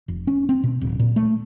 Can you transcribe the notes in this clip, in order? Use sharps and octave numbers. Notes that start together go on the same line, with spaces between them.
F1
C#4
C4
B2
D1
A#2
A3